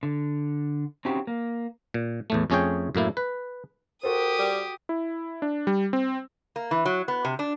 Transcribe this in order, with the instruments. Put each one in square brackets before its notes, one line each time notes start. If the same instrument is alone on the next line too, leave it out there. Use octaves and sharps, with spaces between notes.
[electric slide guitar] D3
C4 C#4 D#4 F#4 G4
A#3
[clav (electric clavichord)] A#2
E2 A2 A3
F2 A3 C#4 G#4 C#5 G5
F#2 A2 A#3 E4
B4
[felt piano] F#4 A4 C5 [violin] G4 D#6 [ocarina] A#4
[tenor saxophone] G3
[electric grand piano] E4
D4
G3
C4
[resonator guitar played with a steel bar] A#3
E3
F#3
B3
C3
D4